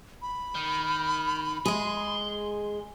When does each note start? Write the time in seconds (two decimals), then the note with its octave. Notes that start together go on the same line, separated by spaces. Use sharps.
0.22 B5
0.55 D#3
1.66 G#3 G#4 C6